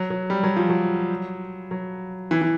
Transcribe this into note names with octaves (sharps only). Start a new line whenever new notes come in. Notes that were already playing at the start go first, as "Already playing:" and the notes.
Already playing: F#3
F#3
G3
F#3
F3
F#3
F#3
E3
E3